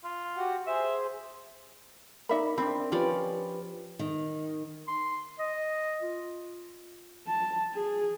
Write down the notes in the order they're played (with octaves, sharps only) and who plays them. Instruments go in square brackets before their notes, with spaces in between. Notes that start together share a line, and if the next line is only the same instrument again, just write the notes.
[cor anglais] F4
[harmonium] F#4 G4 F#5
[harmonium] G#4 C5 [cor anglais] E5
[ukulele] D#4 E5 B5 [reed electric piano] A#4 D5
[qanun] C4 [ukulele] D4 D#4 B5
[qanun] F3 C#4 D5 [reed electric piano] G4 B4
[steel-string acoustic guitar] D#3
[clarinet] C6
D#5
F4
[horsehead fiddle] A5
G#4